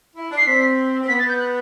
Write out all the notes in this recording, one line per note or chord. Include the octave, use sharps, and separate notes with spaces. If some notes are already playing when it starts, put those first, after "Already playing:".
E4
D4
C7
C4 B6
C4
B3 B6
A6
G6
F#6